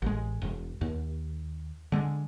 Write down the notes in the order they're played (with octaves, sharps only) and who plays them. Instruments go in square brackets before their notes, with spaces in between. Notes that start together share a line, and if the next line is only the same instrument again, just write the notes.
[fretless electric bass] A1 G#3
E1
D#2
D3 G#3